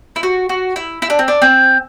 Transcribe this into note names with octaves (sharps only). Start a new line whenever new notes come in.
E4
F#4
F#4
E4
E4
D4
C4
D4
C4